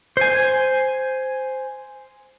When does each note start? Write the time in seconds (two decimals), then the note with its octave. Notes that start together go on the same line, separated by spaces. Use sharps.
0.17 C5 G#5